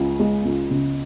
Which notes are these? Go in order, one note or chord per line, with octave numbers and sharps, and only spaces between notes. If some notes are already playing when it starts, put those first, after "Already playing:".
Already playing: C#2 C#3
G#3
C#2
C#3